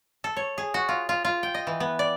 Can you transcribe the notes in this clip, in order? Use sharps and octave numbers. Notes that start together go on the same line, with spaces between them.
A4
C#5
G#4
F#4
F4
F4
F4
G5
D#5
E3
B3
D5